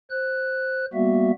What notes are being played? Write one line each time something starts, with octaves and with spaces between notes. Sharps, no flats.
C5 F#6
G3 A#3 B3 F#4 E5